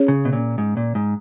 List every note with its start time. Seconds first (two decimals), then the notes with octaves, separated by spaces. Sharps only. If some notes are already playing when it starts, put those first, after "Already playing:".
Already playing: C#4 G#4 C#5
0.08 C#3
0.25 B2
0.33 A#2
0.58 G#2
0.77 A#2
0.95 G#2